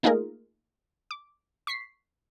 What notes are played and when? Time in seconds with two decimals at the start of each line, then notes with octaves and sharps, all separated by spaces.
0.03 A3 A#3 D#4 F4 G#4 A#4
1.11 D6
1.67 C#6 B6 C7